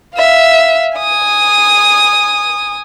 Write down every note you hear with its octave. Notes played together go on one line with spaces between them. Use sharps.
E5 F5
G#5 D#6